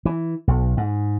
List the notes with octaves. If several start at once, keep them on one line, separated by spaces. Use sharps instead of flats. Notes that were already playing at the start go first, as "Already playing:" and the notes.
E3
B1
G#2